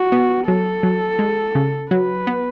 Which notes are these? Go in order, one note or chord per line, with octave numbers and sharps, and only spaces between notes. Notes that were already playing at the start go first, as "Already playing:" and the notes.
Already playing: F#4
B3
F#3 A4
F#3
G#3
C#3
F#3 B4
B3